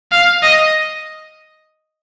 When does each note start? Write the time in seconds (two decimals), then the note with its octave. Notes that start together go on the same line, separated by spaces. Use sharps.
0.12 F5
0.43 D#5